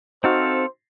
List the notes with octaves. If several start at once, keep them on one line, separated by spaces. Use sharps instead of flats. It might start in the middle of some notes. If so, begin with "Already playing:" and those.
C4 D#4 F#4 A4 C5 F5